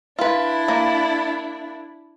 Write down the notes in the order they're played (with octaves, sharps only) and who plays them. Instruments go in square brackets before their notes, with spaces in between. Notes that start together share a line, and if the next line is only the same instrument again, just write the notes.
[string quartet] D4 E4 [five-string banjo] F4 B4
[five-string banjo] A#3